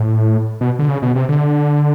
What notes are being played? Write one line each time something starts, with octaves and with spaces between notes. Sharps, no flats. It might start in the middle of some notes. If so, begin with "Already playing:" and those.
Already playing: A2
B2
D3
C#3
B2
C3
D3